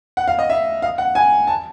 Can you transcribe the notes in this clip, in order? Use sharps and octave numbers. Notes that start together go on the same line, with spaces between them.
F#5
F5
D#5
E5
F5
F#5
G#5
A5